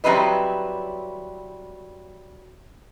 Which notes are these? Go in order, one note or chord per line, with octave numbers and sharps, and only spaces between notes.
F#3 G3 C4 E4 B4 D#5